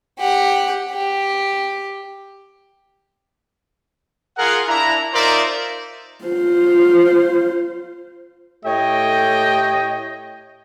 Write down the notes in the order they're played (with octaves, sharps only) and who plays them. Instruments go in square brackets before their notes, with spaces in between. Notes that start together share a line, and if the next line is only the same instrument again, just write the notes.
[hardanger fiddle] G4 F#5
G4
[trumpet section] F4 G#4 A#4 F5 F#5
D4 E4 A#5
D#4 F4 A#4 C5 D5 E5
[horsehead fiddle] F4 C5
[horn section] A2 A3 G4 C#5 D#5 G5